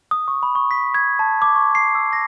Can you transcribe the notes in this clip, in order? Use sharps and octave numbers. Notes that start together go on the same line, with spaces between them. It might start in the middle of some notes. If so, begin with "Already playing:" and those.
D#6
C#6
B5
C#6
B6
G#6
A5
D6
C#6
C7
E6
A#6